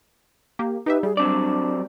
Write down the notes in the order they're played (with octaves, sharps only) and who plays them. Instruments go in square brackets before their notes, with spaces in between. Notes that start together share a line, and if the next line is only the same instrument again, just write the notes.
[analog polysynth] A#3 G4
[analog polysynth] D#4 G4 E5 [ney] B4
[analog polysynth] G3 [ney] G#4
[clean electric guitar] F#3 C4 D5 [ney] D4